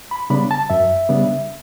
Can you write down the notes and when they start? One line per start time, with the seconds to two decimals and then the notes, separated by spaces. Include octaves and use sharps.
0.11 B5
0.30 C#3 G3 B3 D4 B5
0.51 A5
0.70 F#2 E5
1.09 C#3 G3 B3 D4